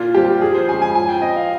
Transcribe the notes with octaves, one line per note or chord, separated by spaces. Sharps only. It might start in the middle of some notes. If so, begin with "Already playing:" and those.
Already playing: A#2 F4
G3 C4 G4
F3 G#4
C5
G#3 C#4 G#5
G#5
F3 G#5
G5
C4 D#5
F5